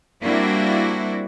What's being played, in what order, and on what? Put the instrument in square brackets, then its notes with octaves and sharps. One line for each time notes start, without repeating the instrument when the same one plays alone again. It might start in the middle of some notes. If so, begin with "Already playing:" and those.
[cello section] G3 A#3 C4 D4 E4 F#4